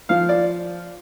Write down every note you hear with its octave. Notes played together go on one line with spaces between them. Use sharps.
F3 F5
D5